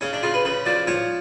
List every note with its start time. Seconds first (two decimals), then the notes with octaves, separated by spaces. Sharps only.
0.01 C#3 C#4
0.13 D4
0.23 C#3 F4
0.34 B4
0.45 C#3 B4
0.66 F3 D5
0.87 F3 C#5